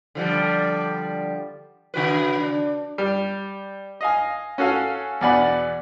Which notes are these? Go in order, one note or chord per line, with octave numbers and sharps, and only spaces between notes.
D3 F3 G3
C#3 F#4 B4
D4
G3
D#5 F5 G#5
C#4 F#4 A4 F5 G#5
E2 B2 D5 F#5 G#5 B5